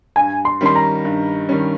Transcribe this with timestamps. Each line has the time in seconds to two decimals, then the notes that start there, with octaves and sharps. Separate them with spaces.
0.16 G2 G#5
0.45 C6
0.61 D#3 G3 C#4 C6
0.76 A#5
1.05 G2
1.49 D#3 G3 C#4